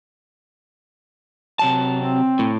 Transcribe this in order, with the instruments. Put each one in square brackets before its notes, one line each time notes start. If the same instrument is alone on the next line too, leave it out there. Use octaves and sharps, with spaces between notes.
[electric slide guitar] C3 F#3 A5
[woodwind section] C4
[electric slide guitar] A2